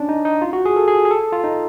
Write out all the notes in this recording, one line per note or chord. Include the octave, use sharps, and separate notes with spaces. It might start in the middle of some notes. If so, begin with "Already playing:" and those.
Already playing: C#4 D4
D#4
D#4
F4
F#4
G#4
A4
G#4
G#4
A4
F4
D#4